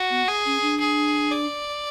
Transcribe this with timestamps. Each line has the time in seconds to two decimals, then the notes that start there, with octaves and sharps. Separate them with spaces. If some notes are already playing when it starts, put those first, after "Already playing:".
Already playing: F#4
0.11 B3
0.29 G#4
0.46 C#4
0.62 D4
0.80 G#4
1.32 D5